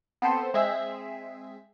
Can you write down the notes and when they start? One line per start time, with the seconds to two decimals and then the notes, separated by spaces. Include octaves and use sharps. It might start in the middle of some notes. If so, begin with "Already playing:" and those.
0.22 B3 C4 A4 C5
0.54 G#3 C4 G#4 E5